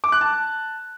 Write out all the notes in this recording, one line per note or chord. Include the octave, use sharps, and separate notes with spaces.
D6
F#6
A5